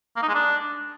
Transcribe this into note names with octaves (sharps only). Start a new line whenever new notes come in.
A#3
D#4
G#3
D4